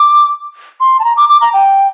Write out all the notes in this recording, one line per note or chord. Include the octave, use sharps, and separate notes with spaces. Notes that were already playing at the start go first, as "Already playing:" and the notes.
Already playing: D6
C6
A5
A#5
D6
D6
A#5
G5